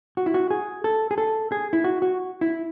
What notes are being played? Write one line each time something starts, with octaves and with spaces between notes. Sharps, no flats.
F#4
E4
F#4
G#4
A4
G#4
A4
G#4
E4
F#4
F#4
E4